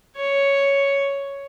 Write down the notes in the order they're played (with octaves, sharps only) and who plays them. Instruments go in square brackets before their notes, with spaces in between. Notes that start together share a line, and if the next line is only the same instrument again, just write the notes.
[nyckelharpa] C#5